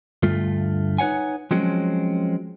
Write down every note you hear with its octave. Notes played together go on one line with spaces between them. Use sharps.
D2 G2 A3 F4
D#4 B4 C#5 F#5 G#5
F3 F#3 G#3 C4 C#4